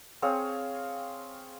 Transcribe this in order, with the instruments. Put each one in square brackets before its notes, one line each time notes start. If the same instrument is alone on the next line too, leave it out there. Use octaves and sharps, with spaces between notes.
[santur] C4 G#4 C#5 F5